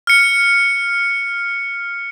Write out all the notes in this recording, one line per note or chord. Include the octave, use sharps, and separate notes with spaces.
F6 C#7